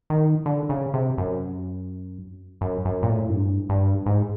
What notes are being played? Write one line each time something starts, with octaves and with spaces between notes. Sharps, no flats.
D#3
D3
C#3
C3
F#2
F#2
F#2
A#2
A2
F#2
G2
G2
G#2